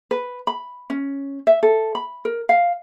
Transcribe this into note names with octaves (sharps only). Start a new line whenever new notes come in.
B4
B5
C#4
E5
A4
B5
A#4
F5